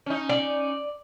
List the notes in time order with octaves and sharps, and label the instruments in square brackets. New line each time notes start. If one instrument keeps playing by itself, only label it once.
[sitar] C#4 D#4
[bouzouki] D5